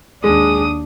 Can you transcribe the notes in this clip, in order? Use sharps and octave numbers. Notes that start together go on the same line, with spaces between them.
D#2 G#3 D4 D#6